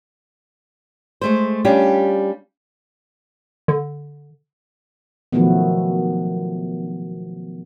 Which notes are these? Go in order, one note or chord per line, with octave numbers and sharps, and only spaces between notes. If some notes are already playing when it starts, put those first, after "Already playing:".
G#3 A3 C5
G3 C#4 D4 F4 G4
D3
B2 D#3 F3 F#3 A3 B3